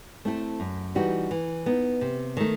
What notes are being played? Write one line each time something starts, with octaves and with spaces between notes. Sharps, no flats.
A3 C4 E4 A4
F#2
E3 G3 D#4 F#4
E3
B3 D#4
C3
D#3 A3